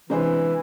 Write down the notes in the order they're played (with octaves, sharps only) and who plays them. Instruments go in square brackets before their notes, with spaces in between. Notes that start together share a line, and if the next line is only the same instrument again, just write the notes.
[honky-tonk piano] C3 G#3 D4 G#4 C5 [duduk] E3